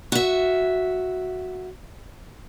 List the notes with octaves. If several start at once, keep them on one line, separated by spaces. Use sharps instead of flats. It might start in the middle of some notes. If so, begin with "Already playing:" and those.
F#4 E5